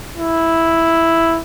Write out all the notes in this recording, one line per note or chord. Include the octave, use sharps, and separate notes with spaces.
E4